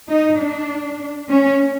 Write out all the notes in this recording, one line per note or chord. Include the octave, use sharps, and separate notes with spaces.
D#4
D4
C#4